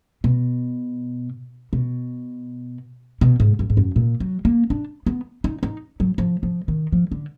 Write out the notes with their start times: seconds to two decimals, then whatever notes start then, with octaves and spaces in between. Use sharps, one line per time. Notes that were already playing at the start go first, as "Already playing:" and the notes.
0.24 B2
1.73 B2
3.21 B2
3.40 G#2
3.59 F#2
3.70 G#2
3.77 F#2
3.96 A#2
4.20 F#3
4.45 A#3
4.70 D4
5.06 B3
5.44 D#4
5.63 D#4
6.00 F#3
6.18 F3
6.43 F3
6.68 D#3
6.92 F3
7.12 D3